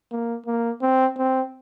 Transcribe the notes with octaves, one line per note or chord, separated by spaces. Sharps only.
A#3
A#3
C4
C4